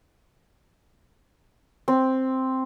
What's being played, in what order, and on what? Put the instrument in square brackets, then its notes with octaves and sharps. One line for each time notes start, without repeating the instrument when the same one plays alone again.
[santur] C4